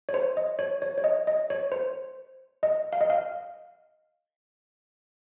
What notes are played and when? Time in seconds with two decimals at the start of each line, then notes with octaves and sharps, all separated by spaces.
0.09 C#5
0.14 C5
0.37 D#5
0.59 C#5
0.82 C#5
0.98 C#5
1.04 D#5
1.27 D#5
1.50 C#5
1.72 C5
2.63 D#5
2.93 F5
3.01 D#5
3.10 F5